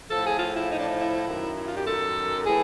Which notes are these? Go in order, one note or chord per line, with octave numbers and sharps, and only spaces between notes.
A2 F3 A4
G#4
F4
E4
D#4
D4
D#4
E4
F#2 D#3
E4
F4
G4
A4
A2 E3 G#4